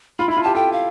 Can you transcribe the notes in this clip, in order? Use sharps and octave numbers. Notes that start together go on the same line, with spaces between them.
F4 B5
E4
B5
F4
G4 A5
A4 G5
F5